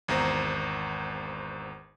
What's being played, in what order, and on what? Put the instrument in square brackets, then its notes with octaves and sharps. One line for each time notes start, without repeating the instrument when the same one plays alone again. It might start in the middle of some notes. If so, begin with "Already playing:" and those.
[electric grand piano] G#1 E2 C5 A#5